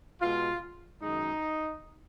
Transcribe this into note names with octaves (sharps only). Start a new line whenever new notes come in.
B2 G#3 F4
F#2 D#3 G#3 D#4